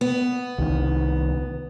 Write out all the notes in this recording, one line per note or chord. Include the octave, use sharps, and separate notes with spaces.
B3
C2 D#3